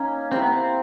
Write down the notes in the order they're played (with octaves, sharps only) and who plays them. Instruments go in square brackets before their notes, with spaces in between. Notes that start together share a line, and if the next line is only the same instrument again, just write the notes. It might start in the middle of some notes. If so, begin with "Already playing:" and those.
Already playing: [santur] A#3 D#4 [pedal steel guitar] C#4
[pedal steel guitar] C4 [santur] E4 G4 A#4
[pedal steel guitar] B3
C4